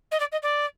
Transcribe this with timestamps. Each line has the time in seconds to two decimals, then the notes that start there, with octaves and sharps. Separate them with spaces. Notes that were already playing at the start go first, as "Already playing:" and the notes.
0.11 D#5
0.20 D5
0.32 D#5
0.42 D5